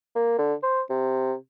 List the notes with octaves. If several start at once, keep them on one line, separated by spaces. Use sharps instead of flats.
A#3
D3
C5
C3